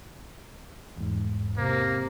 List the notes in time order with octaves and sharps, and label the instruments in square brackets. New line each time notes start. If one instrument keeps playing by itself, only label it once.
[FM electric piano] E2 G#2
[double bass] C3 [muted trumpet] A#3